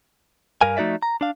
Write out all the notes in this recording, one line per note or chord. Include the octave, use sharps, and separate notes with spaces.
G2 A#4 F5 G#5
F3 A3 D#4 F#4 D5 E5
A#5
D4 F5